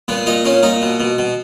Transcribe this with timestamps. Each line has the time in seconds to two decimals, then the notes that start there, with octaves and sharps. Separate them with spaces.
0.08 A#2 B3
0.26 A#2 D#4
0.45 A#2 C#4
0.63 A#2 D#4
0.82 B2
1.00 B2
1.18 B2